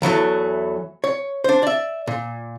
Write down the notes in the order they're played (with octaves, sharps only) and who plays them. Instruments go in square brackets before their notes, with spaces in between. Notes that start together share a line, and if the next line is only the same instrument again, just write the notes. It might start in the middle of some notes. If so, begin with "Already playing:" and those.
[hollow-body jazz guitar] E2 E3 F#3 A3
C#5
D4 C5
D5 E5
A#2